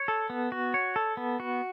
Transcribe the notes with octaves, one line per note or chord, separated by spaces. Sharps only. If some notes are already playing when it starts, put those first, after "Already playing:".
Already playing: C#5
A4
B3
F#4
C#5
A4
B3
F#4